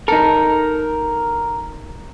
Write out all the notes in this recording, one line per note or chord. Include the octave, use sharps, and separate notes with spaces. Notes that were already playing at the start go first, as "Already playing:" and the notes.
D#4 A4 A#4